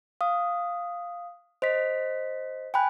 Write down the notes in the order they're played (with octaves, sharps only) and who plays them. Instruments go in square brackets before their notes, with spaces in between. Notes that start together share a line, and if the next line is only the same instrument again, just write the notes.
[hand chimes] F5 D#6
C5 D#5 B6
G5 G#5 B5 F#6